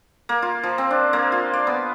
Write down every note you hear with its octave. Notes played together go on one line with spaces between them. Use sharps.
A#3
F4
F3
C4
D4
A#3
F4
D5
B3